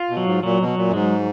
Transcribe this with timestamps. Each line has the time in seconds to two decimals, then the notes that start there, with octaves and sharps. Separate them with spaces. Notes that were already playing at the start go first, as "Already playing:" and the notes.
Already playing: F4
0.10 B2
0.17 F#3
0.25 G#2
0.43 A#2 F#3
0.60 B2
0.68 F#3
0.77 A#2
0.88 F#2
0.93 G#2 G#3